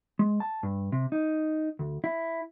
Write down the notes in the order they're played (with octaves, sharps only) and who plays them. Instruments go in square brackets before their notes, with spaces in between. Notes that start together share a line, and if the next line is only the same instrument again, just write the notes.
[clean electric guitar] G#3
A5
G2
C3
D#4
D2
E4